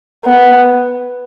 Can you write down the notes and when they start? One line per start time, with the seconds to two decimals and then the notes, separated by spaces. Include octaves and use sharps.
0.25 B3